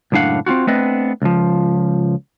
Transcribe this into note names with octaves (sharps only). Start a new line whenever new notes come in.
C#2 F#2 A2 D4 F5 F#5
C4 C#4 F4 F#4
A3 B3 C4 D4 B4 D#5
C#2 F3